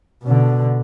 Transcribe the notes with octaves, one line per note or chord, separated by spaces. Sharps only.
B2 D3